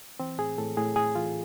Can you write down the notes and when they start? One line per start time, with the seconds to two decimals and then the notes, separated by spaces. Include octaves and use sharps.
0.20 E3 C4
0.38 A2 G#4
0.58 A2 A4
0.77 A2 G#4
0.96 A2 G#4
1.15 E3 F4